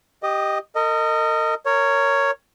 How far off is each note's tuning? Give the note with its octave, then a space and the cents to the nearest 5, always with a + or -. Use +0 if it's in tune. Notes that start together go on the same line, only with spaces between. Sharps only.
G4 +0 D#5 +0 D#6 -40
A#4 -40 D#5 +0
A#4 -15 C#5 +5